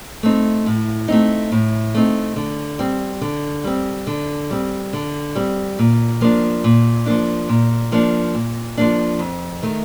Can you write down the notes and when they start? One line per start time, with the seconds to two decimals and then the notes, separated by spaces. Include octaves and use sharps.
0.23 A3 C4 D#4
0.66 A2
1.08 A3 C4 D#4
1.52 A2
1.94 A3 C4 D#4
2.36 D3
2.79 G3 C4
3.21 D3
3.64 G3 C4
4.07 D3
4.51 G3 C4
4.93 D3
5.35 G3 C4
5.79 A#2
6.21 F3 A#3 D4
6.64 A#2
7.06 F3 A#3 D4
7.49 A#2
7.92 F3 A#3 D4
8.34 A#2
8.77 F3 A#3 D4
9.19 F2
9.62 D#3 A3